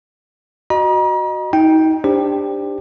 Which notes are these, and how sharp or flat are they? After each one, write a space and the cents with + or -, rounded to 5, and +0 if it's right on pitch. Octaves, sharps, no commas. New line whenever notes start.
F#4 +0 D#5 -20 A#5 +40
D#4 +35 G5 +0
D4 +5 G4 +15 C5 +0